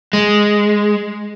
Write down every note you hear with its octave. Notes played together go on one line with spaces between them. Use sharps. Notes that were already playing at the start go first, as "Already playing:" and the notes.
G#3